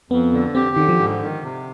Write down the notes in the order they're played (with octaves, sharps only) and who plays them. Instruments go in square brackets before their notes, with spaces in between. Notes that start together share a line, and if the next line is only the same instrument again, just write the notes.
[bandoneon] F2 [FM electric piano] B3
[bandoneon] D3
[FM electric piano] C4 [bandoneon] G4
[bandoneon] D3 [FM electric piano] D#3
[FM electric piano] F3
[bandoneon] G#2
D#3
C3